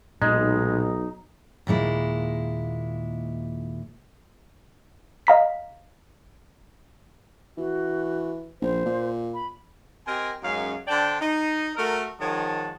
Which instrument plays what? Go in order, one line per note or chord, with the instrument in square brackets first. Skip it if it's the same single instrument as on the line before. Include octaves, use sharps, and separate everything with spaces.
[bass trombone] B1 [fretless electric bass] A#2 [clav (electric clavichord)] G#3 [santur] D#4
[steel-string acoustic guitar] D#2 A#2 G#3 E4
[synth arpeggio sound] D#5 F5 A#5 B6
[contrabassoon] E3 [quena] F#4
[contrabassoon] A#1 [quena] C5
[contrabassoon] A#2
[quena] B5
[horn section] C4 G4 A#4 D#5 G5 G#5
F#2 G#3 A#3 C#4 D#4 F5
D3 D4 C5 D5 G5 A5
D#4
A3 F#4 A4 A#4
D#3 F3 G#3 C#5 F#5 A5